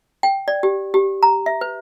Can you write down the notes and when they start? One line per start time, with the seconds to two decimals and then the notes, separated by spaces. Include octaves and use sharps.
0.23 G5
0.48 D5
0.63 G4
0.94 G4
1.23 A#5
1.46 E5
1.61 B4